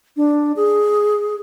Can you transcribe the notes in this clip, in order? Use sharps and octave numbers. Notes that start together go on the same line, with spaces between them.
D4
G#4